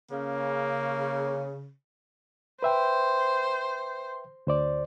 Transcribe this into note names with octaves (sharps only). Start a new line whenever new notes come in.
C#3 A#3
B4 C5 E5 G5
D2 C5 D5